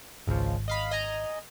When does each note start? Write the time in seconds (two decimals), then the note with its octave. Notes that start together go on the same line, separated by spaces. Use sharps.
0.28 G#1 C#2 F3
0.68 D#5 F5 B5
0.91 D#5 G#5 A#5